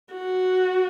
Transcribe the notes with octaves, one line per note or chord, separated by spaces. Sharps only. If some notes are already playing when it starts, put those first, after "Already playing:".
F#4